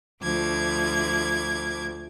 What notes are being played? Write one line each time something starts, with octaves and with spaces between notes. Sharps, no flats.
D2 F3 D6 G#6